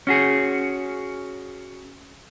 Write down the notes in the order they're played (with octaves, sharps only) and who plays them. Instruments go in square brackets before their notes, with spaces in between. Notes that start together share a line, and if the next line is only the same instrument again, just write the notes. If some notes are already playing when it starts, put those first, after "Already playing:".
[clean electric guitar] C#4 F#4 G#4